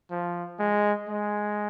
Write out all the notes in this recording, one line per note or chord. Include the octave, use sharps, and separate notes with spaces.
F3
G#3
G#3